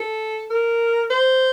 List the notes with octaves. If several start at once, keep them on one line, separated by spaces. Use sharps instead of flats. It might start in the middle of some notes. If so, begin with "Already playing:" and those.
Already playing: A4
A#4
C5